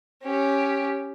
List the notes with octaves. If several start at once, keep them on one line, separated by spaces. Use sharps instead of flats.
C#4 G4